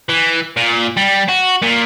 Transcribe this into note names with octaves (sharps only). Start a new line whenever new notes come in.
E3
A#2
G3
F#4
A#2